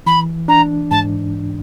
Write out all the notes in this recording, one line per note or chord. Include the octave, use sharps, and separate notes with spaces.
E3 B5
D4 A#5
G#2 A5